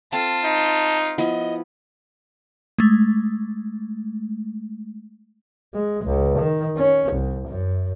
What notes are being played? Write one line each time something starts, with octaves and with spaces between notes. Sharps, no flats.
C4 F4 A4 A5
D#4
F3 B3 E4 D#5
G#3 A3
G#3
C#2
D#3
C#4
C2
F#2